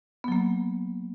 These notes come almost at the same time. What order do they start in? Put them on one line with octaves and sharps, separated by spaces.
B3 F#3 A#3